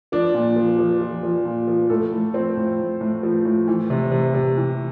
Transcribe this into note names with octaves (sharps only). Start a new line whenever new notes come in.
F3 D4
A#2
F3
F3
F3
F3
A#2
F3
A2 A4
A2
F3 C4
A2
A2
A2
F3
A2
E3
C3
C3
C3
E3